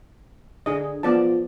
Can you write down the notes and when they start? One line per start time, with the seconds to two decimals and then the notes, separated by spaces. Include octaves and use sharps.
0.66 D3 G#4 D#5
1.03 F3 B3 D5 A5